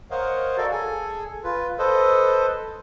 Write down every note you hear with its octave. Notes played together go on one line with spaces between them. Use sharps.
A#4 C5 C#5 D#5 F5 F#5
F#4 A4 A#4 D5 F5
G#4 A4 G#5
F4 B4
A4 B4 C5 D#5